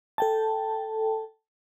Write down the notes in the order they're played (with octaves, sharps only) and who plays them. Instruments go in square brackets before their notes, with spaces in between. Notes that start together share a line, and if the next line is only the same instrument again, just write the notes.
[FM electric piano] A4 G5 A5